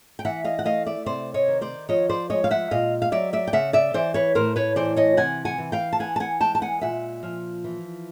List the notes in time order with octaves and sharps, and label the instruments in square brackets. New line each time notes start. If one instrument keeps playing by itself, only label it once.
[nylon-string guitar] G5
E3 E5 F#5
D#5 F5
F#5
A3 D#5 F5
D5 E5
C3 C5 D5
C#5 D#5
D#3
C5 D5
F3 C#5 D#5
C5 D5
G#3 C#5 D#5
F5
E5 F#5
A#2 D#5 F5
F5
F#3 D5 E5
D5 E5
G5
C#3 E5 F#5
D5 E5
E3 C5 D5
B4 C#5
A2 A#4 C5
B4 C#5
E3 C5 D5
C#5 D#5
C3 F#5 G#5
F#5 G#5
E3
F5 G5
A5
E3 F#5 G#5
A5
F#5 G#5
G#3 G5 A5
A5
F#5 G#5
A#2 E5 F#5
F3
E3